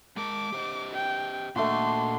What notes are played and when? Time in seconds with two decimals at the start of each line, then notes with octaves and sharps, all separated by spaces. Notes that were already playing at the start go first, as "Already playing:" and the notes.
0.17 G#3 A#4 A5 D6
0.52 G4 C5 D#5
0.93 G5
1.56 A#2 A3 A#3 D4 F#4 D#5 C6